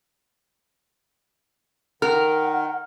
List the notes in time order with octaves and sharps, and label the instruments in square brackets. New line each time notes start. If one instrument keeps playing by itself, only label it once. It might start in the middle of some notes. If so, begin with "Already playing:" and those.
[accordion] D#3 [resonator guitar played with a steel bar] A#4 [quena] F#5 [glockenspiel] F6